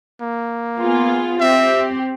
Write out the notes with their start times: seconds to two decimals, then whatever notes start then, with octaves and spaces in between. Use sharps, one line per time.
0.22 A#3
0.79 B3 F4 G#4
1.40 C4 G4 E5